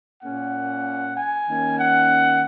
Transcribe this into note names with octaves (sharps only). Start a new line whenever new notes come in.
A#2 A#3 C#4 F#5
G#5
D#3 A#3 C#4
F#5